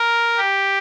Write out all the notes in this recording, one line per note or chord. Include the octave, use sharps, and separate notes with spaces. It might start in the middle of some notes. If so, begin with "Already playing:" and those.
Already playing: A#4
G4